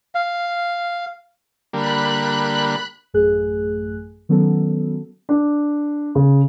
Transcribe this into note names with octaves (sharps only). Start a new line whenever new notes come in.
F5
D3 G3 A#3 B5 F#6
A1 F#2 A3 G#4 F#6
D#3 F#3 B3 C#4 A4
D4
C#3